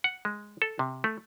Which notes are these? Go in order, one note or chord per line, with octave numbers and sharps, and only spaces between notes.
F#5
G#3
A4
C3
A3